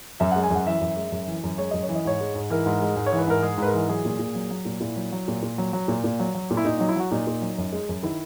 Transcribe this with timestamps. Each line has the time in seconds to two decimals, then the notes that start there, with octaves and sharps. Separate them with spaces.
0.20 F#2 E5
0.32 F#5
0.36 G#3
0.43 G#5
0.51 F#2 F#5
0.66 E3 E5
0.81 F#2
0.97 G#3
1.12 F#2
1.27 E3
1.44 F#2
1.58 G#3 C#5
1.71 F#2 D#5
1.83 C#5
1.89 E3
1.95 D#5
2.05 G#2 C#5
2.21 G#3
2.35 G#2
2.50 E3 A#4
2.66 G#2
2.82 G#3
2.96 G#2
3.06 C#5
3.12 E3
3.18 B4
3.27 G#2 A#4
3.43 G#3 G#4
3.58 G#2 B4
3.67 A#4
3.74 E3
3.89 F#3 G#4
4.05 A#2
4.19 A#2
4.35 F#3
4.51 F#3
4.65 A#2
4.81 A#2 E4
4.96 F#3
5.12 F#3
5.28 A#2
5.42 A#2
5.58 F#3
5.73 F#3
5.88 A#2
6.04 A#2
6.19 F#3
6.34 F#3
6.51 A#2
6.57 E4
6.65 A#2 D#4
6.77 F#3 D#4
6.89 E4
6.96 F#3 F#4
7.11 A#2 D#4
7.27 A#2
7.42 F#3
7.58 F#2
7.72 G#3
7.89 F#2
8.03 D#3 E4